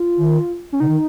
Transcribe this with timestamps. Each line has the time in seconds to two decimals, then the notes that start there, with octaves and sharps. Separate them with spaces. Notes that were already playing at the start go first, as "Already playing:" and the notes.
Already playing: F4
0.18 D#3
0.72 C#4
0.80 C#3 D#4
0.88 D#3